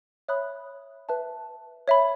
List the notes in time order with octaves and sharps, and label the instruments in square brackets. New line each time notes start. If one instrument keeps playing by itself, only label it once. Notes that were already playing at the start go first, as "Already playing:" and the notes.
[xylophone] C#5 E5 B5 D#6 F#6
B4 E5 A5
C#5 E5 B5